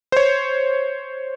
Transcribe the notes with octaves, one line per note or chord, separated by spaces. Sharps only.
C5 C#5